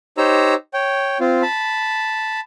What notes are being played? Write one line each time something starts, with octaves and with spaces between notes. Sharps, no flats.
D#4 G4 C5 C#5 A#5 E6
C#5 G5
C4 F4
A5 B5